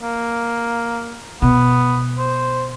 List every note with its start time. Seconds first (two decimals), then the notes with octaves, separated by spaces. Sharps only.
0.02 A#3
1.42 B2 B3
2.18 C5